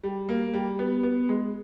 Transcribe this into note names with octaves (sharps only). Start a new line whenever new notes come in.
G3
A#3
G3
B3
B3
G#3